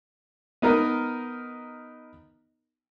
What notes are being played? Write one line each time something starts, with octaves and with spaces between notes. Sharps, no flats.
B3 D#4 A#4